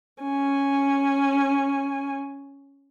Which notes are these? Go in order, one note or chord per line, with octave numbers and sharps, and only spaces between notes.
C#4 G#5